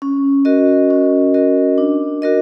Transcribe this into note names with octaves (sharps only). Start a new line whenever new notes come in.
C#4
F#4 A#4 D#5
C#4
F#4 A#4 D#5
D4
F#4 A#4 D#5